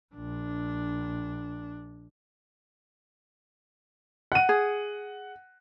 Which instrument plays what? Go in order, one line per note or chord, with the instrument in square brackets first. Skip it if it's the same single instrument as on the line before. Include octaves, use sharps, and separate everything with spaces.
[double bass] A#1 D4
[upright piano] F#5 D#7
[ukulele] G#4